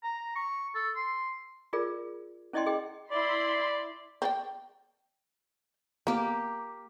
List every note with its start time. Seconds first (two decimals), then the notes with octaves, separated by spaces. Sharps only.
0.04 A#5
0.35 C#6
0.75 A4
0.96 C6
1.73 F4 G#4 A#4 D5
2.53 C#4 E4 D5 D#5 G5 C6
2.66 G#4 D#5 G5
3.11 E4 D5 B5 C6
4.22 C4 D5 G5
6.07 A#3 B3 G4